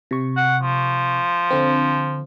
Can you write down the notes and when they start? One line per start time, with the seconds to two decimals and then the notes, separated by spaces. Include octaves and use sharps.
0.11 C3 C#6
0.37 F#5
0.63 F3
1.51 D3 C4